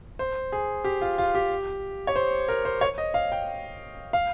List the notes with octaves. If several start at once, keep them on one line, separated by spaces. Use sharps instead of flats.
C5
G#4
G4
F4
F4
G4
C#5
C5
A#4
C5
C#5
D#5
F5
G5
F5